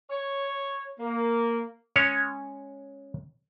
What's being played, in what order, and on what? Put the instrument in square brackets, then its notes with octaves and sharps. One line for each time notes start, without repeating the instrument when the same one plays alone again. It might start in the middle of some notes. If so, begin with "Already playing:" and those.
[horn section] C#5
A#3
[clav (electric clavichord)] G#3 C#4 C#5